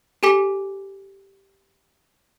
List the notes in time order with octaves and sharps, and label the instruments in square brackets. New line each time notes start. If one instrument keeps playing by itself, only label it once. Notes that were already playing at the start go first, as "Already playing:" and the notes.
[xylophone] G4 A4 G#5 D6 B6